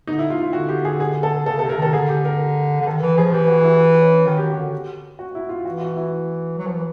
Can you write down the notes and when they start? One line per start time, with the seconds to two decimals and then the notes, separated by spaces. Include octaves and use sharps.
0.07 D3 D#4
0.19 E4
0.30 F4
0.41 F4
0.53 D3 F#4
0.69 G4
0.85 G#4
1.00 G#4
1.23 A4
1.46 C#3 A4
1.59 A4
1.62 C3
1.69 A#4
1.77 D#3 A4
1.93 D3 G#4
2.09 G4
2.25 A#4
2.81 D3
2.86 D#3 A4
3.01 E3
3.17 F3 G#4
3.32 E3 G4
3.48 F#4
3.64 E4
4.02 C#4
4.26 D#3 F#4
4.37 D#3 G4
4.50 F#4
4.57 D3
5.19 F#4
5.35 E4
5.49 F4
5.65 E3 F#4
5.81 F#4
5.97 E4
6.58 F#3
6.67 F3
6.74 E3